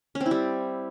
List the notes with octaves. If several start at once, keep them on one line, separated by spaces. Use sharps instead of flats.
C#4
C4
E4
G3